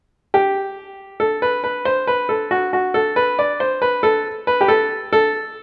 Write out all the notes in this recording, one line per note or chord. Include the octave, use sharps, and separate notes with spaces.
G4
A4
B4
B4
C5
B4
A4
F#4
F#4
A4
B4
D5
C5
B4
A4
B4
G4
A4
A4